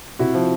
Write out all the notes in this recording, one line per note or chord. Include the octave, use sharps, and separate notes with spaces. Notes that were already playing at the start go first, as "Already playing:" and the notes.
C3 E4 F#4
F3